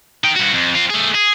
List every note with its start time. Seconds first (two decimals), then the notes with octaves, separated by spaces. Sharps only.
0.24 D#4 G5
0.36 G2 F#4
0.54 F2
0.75 C4 F4
0.90 A3 G#4
1.15 G#4